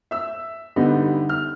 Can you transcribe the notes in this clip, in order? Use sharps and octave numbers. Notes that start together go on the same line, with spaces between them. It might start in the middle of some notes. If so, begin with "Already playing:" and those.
E5 E6
D3 G3 B3 D#4
F6